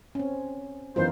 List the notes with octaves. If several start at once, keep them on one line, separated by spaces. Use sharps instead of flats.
C4 C#4
F#2 E3 B3 D#4 F4 C5